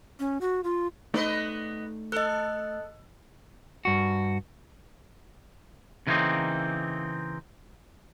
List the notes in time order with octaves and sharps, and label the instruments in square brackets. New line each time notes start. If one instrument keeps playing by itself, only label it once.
[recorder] C#4
F#4
F4
[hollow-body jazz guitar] A3 D#4 D5 [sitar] B3 B4 D#5
[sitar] A4 [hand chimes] D#5 F#6
[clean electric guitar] G2 F#4
C#3 E3 G3 A#3 C4 D#4